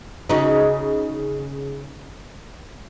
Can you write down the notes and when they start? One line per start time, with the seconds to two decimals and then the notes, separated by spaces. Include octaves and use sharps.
0.29 C#3 D#4 F#4